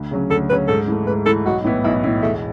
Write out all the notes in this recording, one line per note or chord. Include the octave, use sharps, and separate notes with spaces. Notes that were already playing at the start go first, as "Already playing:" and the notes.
Already playing: D2
C#3 F#3 C#4
D2 A4
C#3 F#3 C#4 B4
G#2 A4
E3 A3
G#2 B4
E3 A3 A4
B1 F#4
A2 E3 B3 E4
B1 E4
A2 E3 B3 E4
E1 A3